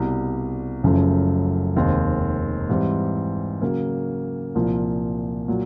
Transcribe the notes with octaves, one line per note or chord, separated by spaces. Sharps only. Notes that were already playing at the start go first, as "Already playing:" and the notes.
Already playing: C2 B2 G3
F#1 F#2 C#3 F3 A3
F1 D#2 D#3 G#3 C4
G#2 E3 G3 C4
C#3 F#3 A#3
C2 A#2 F3
A#2 F#3